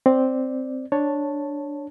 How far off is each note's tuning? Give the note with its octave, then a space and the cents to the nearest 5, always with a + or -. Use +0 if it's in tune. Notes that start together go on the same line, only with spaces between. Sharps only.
C4 +0 D5 +0
D4 +0 C#5 +0 A5 +0